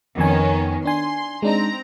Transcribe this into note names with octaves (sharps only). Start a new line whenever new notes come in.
F2 D#3 B3 C#4 G#5
D4 G#5 C6
G#3 C4 D4 D#4 A#5